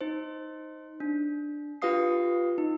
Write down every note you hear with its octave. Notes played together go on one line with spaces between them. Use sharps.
D#4 C5
D4
F4 G4 B4 F5 D#6 C7
D#4